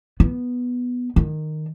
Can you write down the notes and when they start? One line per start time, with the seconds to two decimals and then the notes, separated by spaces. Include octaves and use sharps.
0.20 B3
1.16 D#3